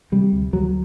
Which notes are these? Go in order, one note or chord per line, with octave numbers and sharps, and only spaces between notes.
C3 G3
D2
D2 F#3